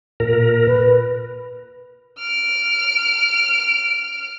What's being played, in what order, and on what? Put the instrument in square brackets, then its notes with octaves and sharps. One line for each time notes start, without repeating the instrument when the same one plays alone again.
[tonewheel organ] A#2 A#4
[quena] B4
[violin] F6 D7